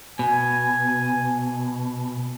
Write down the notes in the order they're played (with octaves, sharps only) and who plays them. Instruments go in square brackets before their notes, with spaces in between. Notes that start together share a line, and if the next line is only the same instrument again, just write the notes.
[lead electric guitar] B2 [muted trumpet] G#5